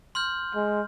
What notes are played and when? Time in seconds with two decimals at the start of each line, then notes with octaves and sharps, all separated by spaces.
0.15 C6 F6 G6
0.55 G#3